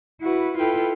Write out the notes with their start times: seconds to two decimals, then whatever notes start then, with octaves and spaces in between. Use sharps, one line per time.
0.21 E4 F#4 B4
0.58 E4 F4 A4 B4 G5